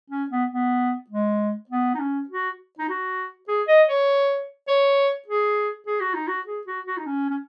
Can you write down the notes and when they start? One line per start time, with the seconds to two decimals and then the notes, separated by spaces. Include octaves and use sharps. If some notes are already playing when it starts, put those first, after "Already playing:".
0.10 C#4
0.30 B3
0.50 B3
1.10 G#3
1.69 B3
1.94 D#4
1.99 C#4
2.29 F#4
2.79 D#4
2.89 F#4
3.48 G#4
3.68 D#5
3.88 C#5
4.68 C#5
5.27 G#4
5.87 G#4
6.00 F#4
6.14 D#4
6.28 F#4
6.46 G#4
6.67 F#4
6.86 F#4
6.97 D#4
7.06 C#4
7.29 C#4